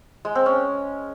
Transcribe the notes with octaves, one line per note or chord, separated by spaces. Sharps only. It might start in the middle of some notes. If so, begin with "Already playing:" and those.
G#3
C4
C#4